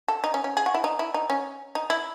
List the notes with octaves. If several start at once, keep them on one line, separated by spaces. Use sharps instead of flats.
A4
D#4
C#4
C#4
G#4
F#4
E4
D#4
E4
D#4
C#4
D#4
E4